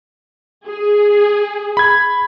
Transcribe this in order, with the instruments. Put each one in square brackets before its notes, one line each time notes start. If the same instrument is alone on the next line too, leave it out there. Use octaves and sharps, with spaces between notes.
[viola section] G#4
[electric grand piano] B5 G#6